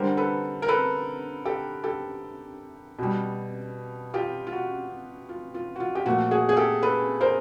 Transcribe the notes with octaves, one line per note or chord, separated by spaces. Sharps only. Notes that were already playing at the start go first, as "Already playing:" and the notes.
Already playing: D3 G3 A#4 C5
A4 B4
A#4
A4 B4
G4 A4
G4 A4
B2 G3
F4 G4
F4
F#4
F4
F4
F#4
F4
G4
A#2 F3 A3 F#4
F#4 G#4
G#4
G4 A4
A4 B4
A#4 C5